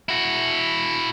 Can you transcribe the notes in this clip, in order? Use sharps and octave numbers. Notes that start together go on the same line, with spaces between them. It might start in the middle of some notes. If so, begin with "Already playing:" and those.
E4 F#4